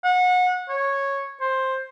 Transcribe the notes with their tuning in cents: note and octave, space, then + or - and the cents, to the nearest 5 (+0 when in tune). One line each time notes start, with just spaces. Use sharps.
F#5 -30
C#5 -10
C5 +10